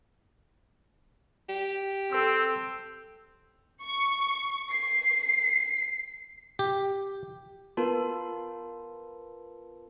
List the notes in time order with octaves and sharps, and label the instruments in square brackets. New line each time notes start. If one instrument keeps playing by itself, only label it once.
[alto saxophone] G4
[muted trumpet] C4 [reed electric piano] A4 E6
[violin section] C#6
C7
[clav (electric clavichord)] G4
[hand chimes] B3 F4 A#4 B4 A5 C6